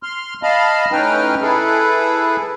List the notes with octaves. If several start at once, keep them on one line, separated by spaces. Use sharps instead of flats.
C6 F6
D#5 F5 A5 B5 F6
A2 C#4 D#4 B4 G5 F6
E4 G#4 A4 B4